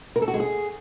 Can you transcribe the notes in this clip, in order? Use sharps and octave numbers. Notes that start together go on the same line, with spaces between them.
A#4
A4
F#4
G#3
G#4